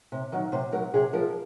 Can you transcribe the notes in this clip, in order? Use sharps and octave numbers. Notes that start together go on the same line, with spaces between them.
C3
D#3 F#3
C3 C5
F#3 A#4
C3 G#4
F3 A#4